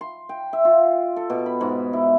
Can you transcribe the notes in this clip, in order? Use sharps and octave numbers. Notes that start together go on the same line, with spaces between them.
C6
G5
E5
F4
A4
B2
B5
G#2
E4